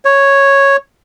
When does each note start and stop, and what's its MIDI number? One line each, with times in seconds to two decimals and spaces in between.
0.05 0.76 73